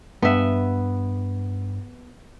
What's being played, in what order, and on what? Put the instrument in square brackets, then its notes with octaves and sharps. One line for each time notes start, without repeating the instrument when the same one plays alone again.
[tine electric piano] G2 [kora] B3 E5